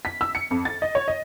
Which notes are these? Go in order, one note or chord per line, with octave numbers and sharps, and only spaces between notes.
B6
E6
C#7
F2
A6
D#5
C#5
D#5